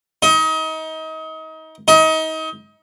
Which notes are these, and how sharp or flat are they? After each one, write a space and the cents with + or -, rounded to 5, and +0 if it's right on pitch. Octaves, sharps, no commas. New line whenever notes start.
D#4 +30
D#4 +30